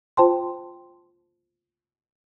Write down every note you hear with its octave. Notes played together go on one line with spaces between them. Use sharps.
F4 C5 G5 A5 C6